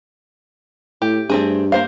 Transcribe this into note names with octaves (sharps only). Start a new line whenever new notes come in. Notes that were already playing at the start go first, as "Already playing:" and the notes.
A2 G4
G2 A3 C4 G#4
A#3 C5 F5